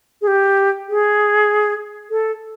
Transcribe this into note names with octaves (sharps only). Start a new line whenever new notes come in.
G#4
G4
G#4
A4